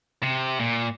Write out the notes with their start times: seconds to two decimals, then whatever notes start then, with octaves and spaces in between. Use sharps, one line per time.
0.23 C3
0.60 A#2